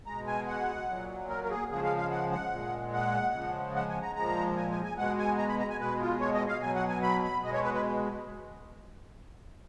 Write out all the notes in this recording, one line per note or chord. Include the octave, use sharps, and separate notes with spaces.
B2 G#3 A#5
G#5
F#5
A#2 F#3
A#4
A#4
G#4
C#3 F3 G#3 G#4
F5
F5
F#5
F#5
A#2 G#3
F#5
C#3 F3 G#3
F#5
G#5
A#5
A#2 F3 G#3 A#5
G#5
G#5
G#5
B2 G#3 F#5
G#5
A#5
B5
A#5
G#5
B2 G#3 B4
F4
C#5
D#5
F5
B2 F#3 G#5
F#5
G#5
B5
B5
B2 G#3 D#5
C#5
B4
B4